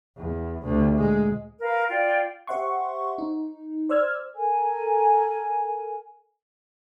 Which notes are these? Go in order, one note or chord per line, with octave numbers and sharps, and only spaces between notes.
E2
D2 C3
A#2 G#3
A#4 B4 F5
F4 D5 G5
G4 C5 E5 F#5 C6 C#6
D#4
C5 D5 E6 F6 G#6
A4 A#4 G#5